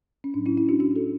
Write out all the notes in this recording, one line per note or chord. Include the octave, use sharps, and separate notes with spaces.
C#4
A2 F#3 D4
C#4 E4
C#4 E4
D4 F#4
D4 F#4
F#4 A4